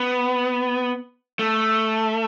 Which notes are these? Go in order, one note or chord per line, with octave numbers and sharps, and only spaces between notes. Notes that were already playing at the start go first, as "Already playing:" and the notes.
Already playing: B3
A3